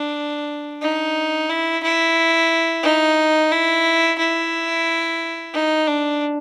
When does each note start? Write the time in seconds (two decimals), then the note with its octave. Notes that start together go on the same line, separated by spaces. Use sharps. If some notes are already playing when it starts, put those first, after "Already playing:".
Already playing: D4
0.82 D#4
1.49 E4
1.84 E4
2.84 D#4
3.52 E4
4.19 E4
5.54 D#4
5.87 D4